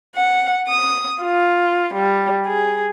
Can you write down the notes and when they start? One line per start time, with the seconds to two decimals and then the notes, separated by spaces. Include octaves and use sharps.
0.15 F#5
0.69 D#6
1.22 F4
1.95 G3
2.46 G#4